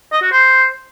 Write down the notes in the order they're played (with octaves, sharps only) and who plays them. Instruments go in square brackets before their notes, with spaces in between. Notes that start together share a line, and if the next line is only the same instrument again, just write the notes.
[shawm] D#5
F#4
C5